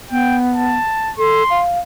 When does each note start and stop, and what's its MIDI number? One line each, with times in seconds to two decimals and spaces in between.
0.11 0.76 59
0.11 0.37 79
0.54 1.12 81
1.18 1.43 69
1.18 1.61 84
1.50 1.79 77